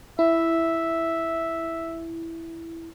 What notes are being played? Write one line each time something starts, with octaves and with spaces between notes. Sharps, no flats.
E4 E5